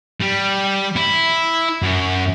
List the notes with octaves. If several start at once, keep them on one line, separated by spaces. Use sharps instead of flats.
G3
E4
F#2